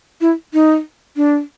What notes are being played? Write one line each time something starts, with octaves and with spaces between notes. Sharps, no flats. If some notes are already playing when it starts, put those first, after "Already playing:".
E4
D#4
D4